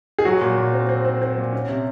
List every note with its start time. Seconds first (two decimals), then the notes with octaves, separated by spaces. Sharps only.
0.19 G#4
0.25 F#3 F#4
0.41 A#2
0.58 A#2
0.73 C4
0.89 C4
1.05 C4
1.22 C4
1.38 A#2
1.52 C#4
1.69 C3